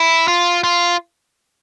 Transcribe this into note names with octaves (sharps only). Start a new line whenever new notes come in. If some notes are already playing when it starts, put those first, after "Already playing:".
Already playing: E4
F4
F4